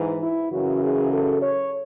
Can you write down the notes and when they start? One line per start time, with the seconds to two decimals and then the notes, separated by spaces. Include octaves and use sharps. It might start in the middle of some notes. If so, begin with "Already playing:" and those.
Already playing: G#2 E3
0.21 E4
0.51 F#2 C#3 E3 F#4
0.81 G#4
1.11 A4
1.40 C#5